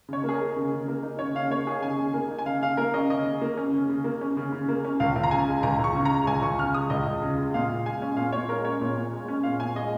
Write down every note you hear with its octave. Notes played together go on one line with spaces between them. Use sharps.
C#3 C#5
A#3
G#4
D#4 A#4
C#3
C#3
A#3
D#4
C#3 C#5
C#3 F5
A#3 C#5
D#4 G#4
C#3 G#5
C#3
A#3
D#4
G#5
C#3 F5
C#3 F5
A#3 A#4
C#4 D#5
C#3 D#5
C#3
A#3
C#4
C#3
C#3
A#3
C#4
C#3
C#3
A#3
C#4
C#2 F5
C#2
A#5
C#3 G#5
G#3
C#2 A#5
C#2 C#6
C#3
A#5
G#3
C#2 G#5
C#2 C#6
C#3 F6
G#3 D#6
C#2 D#5
C#2
C#3
G#3
A#2 F5
A#2
G#3 G#5
C#4
A#2 F5
A#2 C#5
G#3 A#4
C#4 C#5
A#2
A#2
G#3
C#4
A#2 F5
A#2 G#5
G#3 D#5